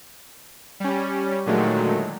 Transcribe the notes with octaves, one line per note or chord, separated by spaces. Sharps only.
G3 C#4
A#2 D3 D#3 F#3 G#3 A3